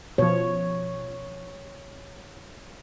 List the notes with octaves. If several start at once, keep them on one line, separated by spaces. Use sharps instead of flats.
B2 F3 C#5